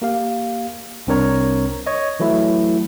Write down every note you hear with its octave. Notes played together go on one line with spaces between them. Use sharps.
A#3 G4 F5
C2 C4 D4 A#4 C#5 A#5
C#5 D#5
E3 F#3 A3 E4